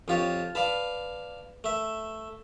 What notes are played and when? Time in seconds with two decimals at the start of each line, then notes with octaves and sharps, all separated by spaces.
0.08 F2 F3 F4 G4 C#5
0.55 B4 D5 F5 A5
1.64 A3 E5